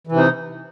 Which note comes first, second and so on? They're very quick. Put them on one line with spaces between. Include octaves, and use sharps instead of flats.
E3 C3 D#4